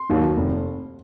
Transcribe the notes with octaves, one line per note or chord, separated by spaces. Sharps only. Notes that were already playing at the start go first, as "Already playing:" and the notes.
Already playing: C6
D#2 D#3 F#3
F1